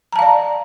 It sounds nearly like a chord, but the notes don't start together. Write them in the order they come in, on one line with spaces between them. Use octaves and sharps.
A#5 A5 F5 D5